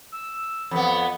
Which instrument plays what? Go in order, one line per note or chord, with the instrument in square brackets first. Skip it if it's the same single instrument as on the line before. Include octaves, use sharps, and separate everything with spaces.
[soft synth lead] E6
[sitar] F2 B3 [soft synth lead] B5